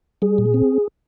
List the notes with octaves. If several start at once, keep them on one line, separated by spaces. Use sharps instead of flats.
G3 G#4
A#2
C4